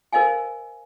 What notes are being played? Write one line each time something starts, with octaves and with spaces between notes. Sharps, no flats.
A#4 C5 D#5 F5 G#5